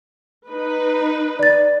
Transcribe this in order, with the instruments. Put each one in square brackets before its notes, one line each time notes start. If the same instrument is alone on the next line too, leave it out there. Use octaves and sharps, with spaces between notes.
[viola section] D#4 B4
[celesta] D5 A6